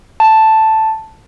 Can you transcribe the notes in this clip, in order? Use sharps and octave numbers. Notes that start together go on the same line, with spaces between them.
A5